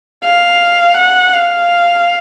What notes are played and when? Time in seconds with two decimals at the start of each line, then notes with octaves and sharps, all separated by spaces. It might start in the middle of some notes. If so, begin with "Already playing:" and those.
0.24 F5
0.97 F#5
1.34 F5